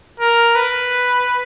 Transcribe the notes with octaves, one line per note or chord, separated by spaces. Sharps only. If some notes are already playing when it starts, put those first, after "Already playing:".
A#4
B4